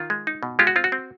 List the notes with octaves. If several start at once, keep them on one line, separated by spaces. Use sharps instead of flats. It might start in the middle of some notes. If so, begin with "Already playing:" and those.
Already playing: D#3 F4
G#3
D#4
B2
G#3 F4 G4
F#4
C4 F4
F#4
C4